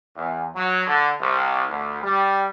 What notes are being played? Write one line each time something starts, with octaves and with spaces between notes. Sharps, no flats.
E2
F#3
D3
C2
D2
G3